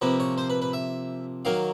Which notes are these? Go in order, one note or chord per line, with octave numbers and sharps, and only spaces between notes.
C3 F3 A#3 B4
C#5
C5
B4
B4
E5
D#3 F#3 A#3 F5